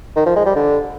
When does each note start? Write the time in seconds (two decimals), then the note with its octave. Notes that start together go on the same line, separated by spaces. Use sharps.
0.16 D#3
0.26 F3
0.36 G#3
0.46 G3
0.56 D3